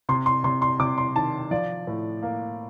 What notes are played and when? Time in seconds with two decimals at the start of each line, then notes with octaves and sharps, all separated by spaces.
0.09 C3 C6
0.26 C6
0.44 C3 C6
0.62 C6
0.80 C3 D6
0.98 C6
1.15 D#3 A5
1.51 F3 D5
1.87 A2
2.23 A#3